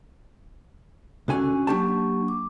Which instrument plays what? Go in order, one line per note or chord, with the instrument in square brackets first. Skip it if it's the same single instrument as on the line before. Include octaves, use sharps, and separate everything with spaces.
[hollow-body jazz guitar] C#2 D3 G#5 [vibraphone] C#4 F#4
[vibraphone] F#3 A#3 C#6 [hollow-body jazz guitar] D4 G4 A5
[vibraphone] D6